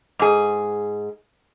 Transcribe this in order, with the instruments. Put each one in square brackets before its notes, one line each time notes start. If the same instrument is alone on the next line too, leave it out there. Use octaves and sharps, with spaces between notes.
[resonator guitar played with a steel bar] G#2 G#4